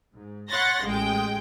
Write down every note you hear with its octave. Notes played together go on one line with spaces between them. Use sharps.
G#2
C#5 F#5 B5 C6 A6 A#6
A1 G#3 G5